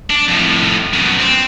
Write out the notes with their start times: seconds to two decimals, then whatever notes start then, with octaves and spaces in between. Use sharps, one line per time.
0.10 D4
0.28 F2 A2
0.93 F#2 B2
1.20 C4